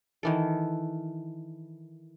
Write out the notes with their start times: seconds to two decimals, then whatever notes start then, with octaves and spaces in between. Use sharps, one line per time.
0.23 D#3 E3 A4